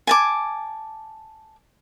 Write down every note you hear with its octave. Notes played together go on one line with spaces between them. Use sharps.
G#5 A5 D6